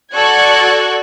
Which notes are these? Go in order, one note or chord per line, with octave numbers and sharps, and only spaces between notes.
F#4 A4 D5 C#6 F#6 G#6